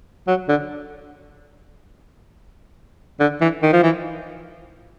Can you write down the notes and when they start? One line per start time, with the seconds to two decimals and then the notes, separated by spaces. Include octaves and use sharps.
0.27 F#3
0.48 D3
3.20 D3
3.41 E3
3.62 D#3
3.73 F3
3.83 E3